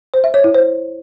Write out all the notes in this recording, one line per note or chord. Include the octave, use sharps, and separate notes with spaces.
C5
E5
C#5
E4
C5